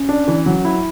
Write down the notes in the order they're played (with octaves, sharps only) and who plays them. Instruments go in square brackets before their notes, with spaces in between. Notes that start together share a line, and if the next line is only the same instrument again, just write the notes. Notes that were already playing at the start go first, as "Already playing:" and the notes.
Already playing: [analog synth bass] C#4
[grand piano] D4
E3
F#3
E4